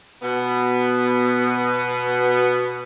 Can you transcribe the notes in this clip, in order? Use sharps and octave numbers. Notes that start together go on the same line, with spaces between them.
B2 B3